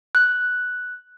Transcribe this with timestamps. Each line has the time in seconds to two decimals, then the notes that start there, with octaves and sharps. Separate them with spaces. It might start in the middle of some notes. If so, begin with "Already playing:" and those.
0.15 F#6